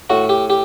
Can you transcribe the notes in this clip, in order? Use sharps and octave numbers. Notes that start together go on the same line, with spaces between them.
A2 F#4
G4
G4